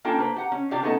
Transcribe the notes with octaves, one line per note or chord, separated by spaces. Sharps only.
A#3 C#4 D4 F4 A4 G5
A#3 B4 C5
G4 F#5 A#5
C#4
C3 D4 F4 G4 D5 F5
A3 B3 C#4 D#4 G4 A4